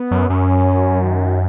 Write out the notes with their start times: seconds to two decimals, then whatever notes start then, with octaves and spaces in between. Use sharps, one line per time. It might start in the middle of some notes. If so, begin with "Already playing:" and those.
Already playing: B3
0.11 F#2
0.30 F#2 C#4
1.02 D#3